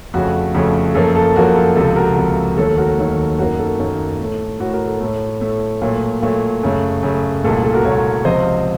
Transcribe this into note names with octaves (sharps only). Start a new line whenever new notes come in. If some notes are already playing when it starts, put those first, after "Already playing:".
F2 C#3 A3 F#4
F2 C#3 A3
F#2 F3 A#3 A4
A4
F#2 F3 A#3 F#4 A#4
A4
C#2 C3 F3 A4
F#4 A#4
C#2 C3 F3
D#2 D#3 F#3 A3 A4
F#4 A#4
D#2 D#3 F#3 A3
F#2 D#3 A#3 F#4 A#4
A4
F#2 D#3 A#3
A2 A3
A2 A3 F#4 A#4
F#4 A#4
A4
A2 A3
A2 A3
A#2 F#3 A3
A#2 F#3 A3
F#2 C#3 A3
F#2 C#3 A3
C2 A#2 A3 A4
A4
F#4 A#4
C2 A#2 A3 A#4 C#5
C#2 C3 F3 C5 D#5